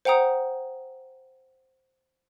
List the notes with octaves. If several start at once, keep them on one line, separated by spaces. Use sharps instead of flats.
C5 F#5 G5 A#5 D#6